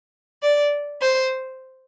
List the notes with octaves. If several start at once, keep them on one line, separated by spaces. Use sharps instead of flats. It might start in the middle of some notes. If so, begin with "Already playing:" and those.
D5
C5